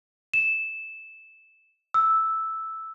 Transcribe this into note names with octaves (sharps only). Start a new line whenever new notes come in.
E7
E6